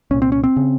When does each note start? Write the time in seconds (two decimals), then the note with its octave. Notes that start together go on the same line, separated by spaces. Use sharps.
0.11 C2 A#2 C#4
0.22 C4
0.32 C#4
0.44 C4
0.57 C#3